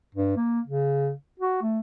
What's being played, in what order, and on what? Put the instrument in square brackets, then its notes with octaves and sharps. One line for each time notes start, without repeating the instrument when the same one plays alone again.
[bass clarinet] G2
A#3
C#3
F#4
A3